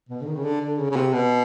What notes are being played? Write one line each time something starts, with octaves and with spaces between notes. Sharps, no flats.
B2
D3
D#3
C#3
D3
D3
C#3
C#3
C3
B2